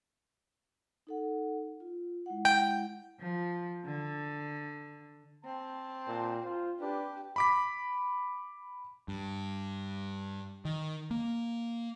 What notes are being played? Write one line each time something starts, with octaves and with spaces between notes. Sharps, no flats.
D#4 A4 F#5
F4
G#3 E4 F#5
G5
F3
D3
C4 A5
A#2
F4 C5
D4 G4 B4
B5 D6 B6
G2
D#3
A#3